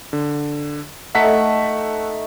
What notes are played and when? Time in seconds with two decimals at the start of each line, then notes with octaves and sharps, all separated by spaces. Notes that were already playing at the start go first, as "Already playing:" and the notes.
0.13 D3
1.15 A3 D#4 E5 F#5 B6